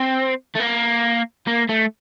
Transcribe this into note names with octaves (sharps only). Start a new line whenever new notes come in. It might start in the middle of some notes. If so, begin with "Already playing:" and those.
Already playing: C4
A3
A#3
A#3
A3